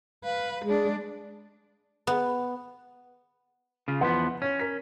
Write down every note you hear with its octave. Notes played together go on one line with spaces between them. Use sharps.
B4 F5
G#3 D4 G#4
B3
C#3 F4
E2 F3 B3 B4 F#5 C6
C#4 C#5
A#4 B6